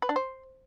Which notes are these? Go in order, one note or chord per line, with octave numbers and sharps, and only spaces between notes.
B4
D4
C5